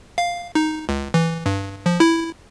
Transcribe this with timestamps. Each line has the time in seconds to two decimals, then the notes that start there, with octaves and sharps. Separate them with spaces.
0.18 F5
0.55 D#4
0.89 C#2
1.14 E3
1.46 G2
1.86 F3
2.00 E4